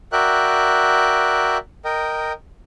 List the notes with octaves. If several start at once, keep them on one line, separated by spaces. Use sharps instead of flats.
F#4 A#4 D5 E5 G5 F#6
A#4 D#5 G5